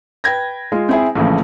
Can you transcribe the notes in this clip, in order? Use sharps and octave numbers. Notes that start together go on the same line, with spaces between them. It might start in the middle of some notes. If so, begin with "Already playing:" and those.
B4 G5 G#6 A#6
G#3 F4
C4 E4 G#4
A#1 A2 C#3 E3 F3